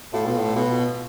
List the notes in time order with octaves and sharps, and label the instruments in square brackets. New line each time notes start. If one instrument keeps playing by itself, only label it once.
[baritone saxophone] A2 [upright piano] F4
[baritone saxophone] B2
A2
[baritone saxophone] B2 [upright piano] F4